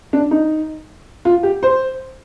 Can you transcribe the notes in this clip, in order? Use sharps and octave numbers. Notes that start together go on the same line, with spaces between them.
D4
D#4
F4
G4
C5